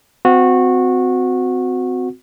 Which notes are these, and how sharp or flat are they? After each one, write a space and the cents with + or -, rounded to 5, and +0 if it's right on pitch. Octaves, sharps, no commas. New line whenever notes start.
C4 -30 F#4 -20